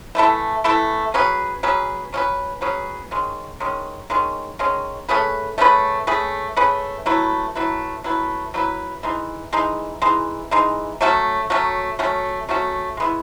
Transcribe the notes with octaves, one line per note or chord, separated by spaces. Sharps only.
E3 A3 E4 A4
E3 A3 E4 A4
F#3 C#4 G#4 B4
F#3 C#4 G#4 B4
F#3 C#4 G#4 B4
F#3 C#4 G#4 B4
D#3 G#3 C#4
D#3 G#3 C#4
D#3 G#3 C#4
D#3 G#3 C#4
A3 C#4 G#4 B4
A3 C#4 G#4 B4
A3 C#4 G#4 B4
A3 C#4 G#4 B4
F#3 A3 E4 B4
F#3 A3 E4 B4
F#3 A3 E4 B4
F#3 A3 E4 B4
E3 G#3 D#4
E3 G#3 D#4
E3 G#3 D#4
E3 G#3 D#4
F#3 A3 C#4 F#4
F#3 A3 C#4 F#4
F#3 A3 C#4 F#4
F#3 A3 C#4 F#4
G#3 B3 E4